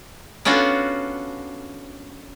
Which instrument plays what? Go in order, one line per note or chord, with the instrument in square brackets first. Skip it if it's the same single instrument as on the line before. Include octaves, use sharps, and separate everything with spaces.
[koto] B3 C#4 D4 F4 F#4 A4